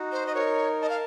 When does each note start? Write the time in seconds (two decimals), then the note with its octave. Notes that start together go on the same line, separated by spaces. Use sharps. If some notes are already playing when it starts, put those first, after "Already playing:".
Already playing: D#4 F#4
0.12 C5
0.26 D#5
0.35 A#4 C#5
0.82 D#5 A5
0.89 F5